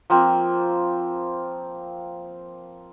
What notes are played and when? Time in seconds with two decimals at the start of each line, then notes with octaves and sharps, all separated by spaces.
0.10 F3 A#3 C4